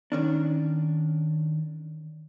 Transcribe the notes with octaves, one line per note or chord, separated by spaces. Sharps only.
D#3 C#4 D4